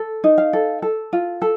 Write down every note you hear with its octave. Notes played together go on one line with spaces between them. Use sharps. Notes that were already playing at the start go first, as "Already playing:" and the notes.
Already playing: A4
D#4
F5
A4
A4
F4
A4